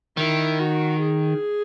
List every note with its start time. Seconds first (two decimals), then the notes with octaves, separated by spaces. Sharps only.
0.17 D#3 E4
0.59 F#4
1.00 G#4